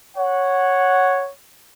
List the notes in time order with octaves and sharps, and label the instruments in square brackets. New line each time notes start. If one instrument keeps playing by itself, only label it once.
[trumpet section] C#5 F#5